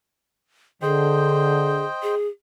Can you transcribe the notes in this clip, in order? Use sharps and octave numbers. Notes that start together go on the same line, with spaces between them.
D3 G#4 C5 D#5 G5
G#4